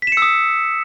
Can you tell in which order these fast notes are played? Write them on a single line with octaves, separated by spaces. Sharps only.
B6 E7 C#7 E6 D#6